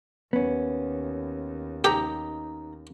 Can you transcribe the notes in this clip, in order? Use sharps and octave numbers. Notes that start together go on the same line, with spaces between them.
D#2 B3 C#4
D#4 G4 A#5